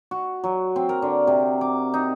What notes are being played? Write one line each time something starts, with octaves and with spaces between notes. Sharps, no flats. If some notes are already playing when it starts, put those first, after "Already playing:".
F#4
F#3
C4
A#4
D3
C3
D6
D#4